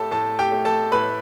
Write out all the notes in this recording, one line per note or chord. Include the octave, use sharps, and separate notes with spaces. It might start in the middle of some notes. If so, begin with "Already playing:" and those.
Already playing: A2 A3 G4 A4 A5
A2 A4 A5
G4 G5
A3
A4 A5
A2 B4 B5